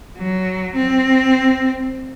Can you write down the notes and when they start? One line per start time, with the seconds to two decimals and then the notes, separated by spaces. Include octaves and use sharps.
0.17 F#3
0.75 C4